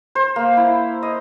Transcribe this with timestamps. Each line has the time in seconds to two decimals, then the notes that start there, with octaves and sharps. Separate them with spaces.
0.15 C5
0.36 A#3
0.57 E4
1.03 D#5